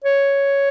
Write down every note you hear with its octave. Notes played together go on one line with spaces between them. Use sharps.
C#5